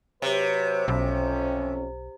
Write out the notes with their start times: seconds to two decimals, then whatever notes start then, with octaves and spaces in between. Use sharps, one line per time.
0.22 C3 F#3 B4 C#5
0.88 B1 F2 C#4